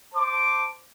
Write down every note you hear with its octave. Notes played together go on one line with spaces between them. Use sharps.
C5 A5 D6